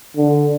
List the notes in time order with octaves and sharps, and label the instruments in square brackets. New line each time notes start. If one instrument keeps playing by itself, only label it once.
[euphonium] D3